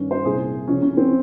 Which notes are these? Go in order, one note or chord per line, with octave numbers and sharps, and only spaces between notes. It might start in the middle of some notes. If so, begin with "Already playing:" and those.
Already playing: G2 D#3 C#4
C5
C2 A#2 G#4
F2 C#3 C#4
C#4
C4